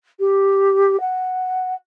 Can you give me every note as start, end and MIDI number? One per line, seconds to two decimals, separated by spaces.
0.20 1.00 67
1.01 1.74 78